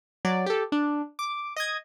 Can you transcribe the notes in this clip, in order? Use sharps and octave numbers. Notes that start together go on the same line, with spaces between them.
F#3 D5
G4 A4
D4
D6
D#5 D#6 G#6